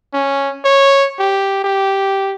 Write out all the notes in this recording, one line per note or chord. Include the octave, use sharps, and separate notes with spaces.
C#4
C#5
G4
G4